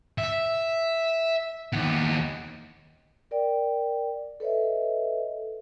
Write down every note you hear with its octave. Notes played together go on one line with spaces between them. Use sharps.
E5
D#2 B3
A#4 D5 G5
A4 B4 C#5 D#5 E5